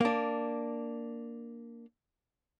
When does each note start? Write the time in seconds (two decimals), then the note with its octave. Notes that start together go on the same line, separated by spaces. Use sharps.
0.01 A#3 D4